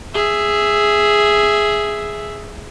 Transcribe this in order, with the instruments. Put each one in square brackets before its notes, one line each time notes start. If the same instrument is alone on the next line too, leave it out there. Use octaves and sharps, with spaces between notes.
[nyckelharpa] G#4 E5